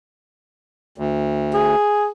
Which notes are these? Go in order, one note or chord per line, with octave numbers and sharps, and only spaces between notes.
D2
G#4